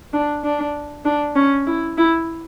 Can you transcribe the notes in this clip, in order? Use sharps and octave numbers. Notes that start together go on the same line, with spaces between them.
D4
D4
D4
C#4
E4
E4